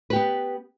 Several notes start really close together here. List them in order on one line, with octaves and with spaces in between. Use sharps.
B4 G4 B3